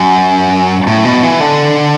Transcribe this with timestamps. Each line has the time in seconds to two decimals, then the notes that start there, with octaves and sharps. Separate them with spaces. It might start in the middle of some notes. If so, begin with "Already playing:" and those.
Already playing: F#2
0.87 A2
1.05 B2
1.23 E3
1.40 D3